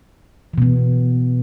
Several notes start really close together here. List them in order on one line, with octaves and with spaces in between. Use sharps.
E3 B2 B3